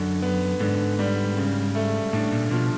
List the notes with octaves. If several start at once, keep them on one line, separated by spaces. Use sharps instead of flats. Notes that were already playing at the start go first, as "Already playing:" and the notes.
Already playing: F#2 D3
B3
G#2 D3
G3
C#3
A3
A2 D4
A#2
B2 F3